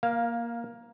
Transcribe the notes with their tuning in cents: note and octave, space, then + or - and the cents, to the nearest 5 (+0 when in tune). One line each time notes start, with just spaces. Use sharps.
A#3 +10 F5 +0